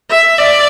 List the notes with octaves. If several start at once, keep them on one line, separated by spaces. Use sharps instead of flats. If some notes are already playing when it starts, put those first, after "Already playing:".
E5
D5